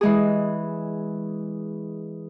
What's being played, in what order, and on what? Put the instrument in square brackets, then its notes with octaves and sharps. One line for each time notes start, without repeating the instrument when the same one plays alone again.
[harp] E3 G#3 G#4